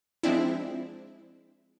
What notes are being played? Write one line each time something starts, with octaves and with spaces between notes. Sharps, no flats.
F3 G#3 C4 D4 E4